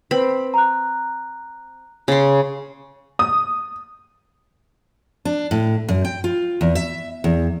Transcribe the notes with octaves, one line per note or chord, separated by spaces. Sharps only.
C4 B4 B5
A#5 F#6
C#3 C6
D#6
D4
A2
F#2
G5
F4
E2
E5
E2